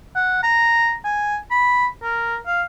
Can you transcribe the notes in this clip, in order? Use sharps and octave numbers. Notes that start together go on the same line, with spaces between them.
F#5
A#5
G#5
B5
A#4
F5